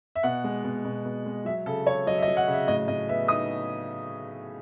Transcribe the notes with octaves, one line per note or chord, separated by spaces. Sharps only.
E5
B2 F#5
G#3
B2
B2
B2
G#3
F#3 E5
C#3 A4
C#3 C#5
F#3 D#5
E5
D#5
F#3
F#5
C#3 E5
A2 D#5
A2 D#5
B3 E5
D#4 D#6